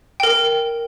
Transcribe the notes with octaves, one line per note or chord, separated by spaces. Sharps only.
A#4 G5